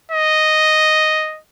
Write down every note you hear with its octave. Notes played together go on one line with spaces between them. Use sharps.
D#5